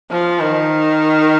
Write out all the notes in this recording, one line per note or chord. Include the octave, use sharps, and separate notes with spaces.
F3
D#3